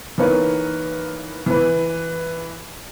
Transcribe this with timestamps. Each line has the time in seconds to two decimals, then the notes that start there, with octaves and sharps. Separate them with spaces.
0.18 E3 A#3 D#4 B4 C#5
1.46 E3 B4